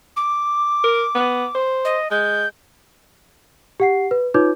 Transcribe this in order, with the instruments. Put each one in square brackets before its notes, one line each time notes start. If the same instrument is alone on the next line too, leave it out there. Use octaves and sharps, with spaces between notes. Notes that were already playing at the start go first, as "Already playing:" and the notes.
[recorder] D6
[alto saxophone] A#4
B3
C5
[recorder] D#5
[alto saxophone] G#3 [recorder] G6
[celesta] G4 F#5 C7
B4
D#4 F4 B4 C#5 D6 G6